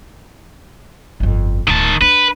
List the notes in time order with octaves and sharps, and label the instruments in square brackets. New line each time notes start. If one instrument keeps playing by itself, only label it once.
[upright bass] G1 F2
[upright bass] D1 [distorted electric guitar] D#3 A5
[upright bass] D4 [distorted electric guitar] B4